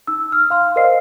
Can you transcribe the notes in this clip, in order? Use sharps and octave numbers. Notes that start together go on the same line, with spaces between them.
D#4 E6
F6
F5 C6 F6
A#4 C5 D5 D#5 F5 C7